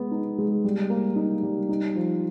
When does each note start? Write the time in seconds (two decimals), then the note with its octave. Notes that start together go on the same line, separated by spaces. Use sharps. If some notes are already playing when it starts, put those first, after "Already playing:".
Already playing: G#3 B3
0.11 D#4
0.38 G#3
0.64 G3
0.90 A#3
1.16 D#4
1.43 G3
1.69 D#4
1.95 F3